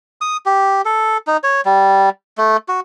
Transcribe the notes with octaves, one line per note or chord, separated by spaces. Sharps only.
D#6
G4
A4
D#4
C#5
G3
A3
F#4